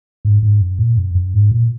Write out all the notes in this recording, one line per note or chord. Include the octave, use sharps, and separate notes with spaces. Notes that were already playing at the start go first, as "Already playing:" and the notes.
G#2
G#2
F#2
A#2
F#2
F#2
G#2
A#2